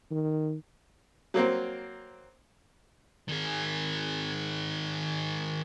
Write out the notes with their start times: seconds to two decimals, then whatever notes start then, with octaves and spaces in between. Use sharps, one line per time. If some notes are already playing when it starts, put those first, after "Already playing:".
0.11 D#3
1.34 F#3 A#3 C4
3.28 D#3 G#4